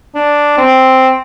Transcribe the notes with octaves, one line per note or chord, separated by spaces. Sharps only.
D4
C4